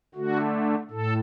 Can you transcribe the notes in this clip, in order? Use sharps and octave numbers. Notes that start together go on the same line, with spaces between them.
D3 A3 F#4
A2 A4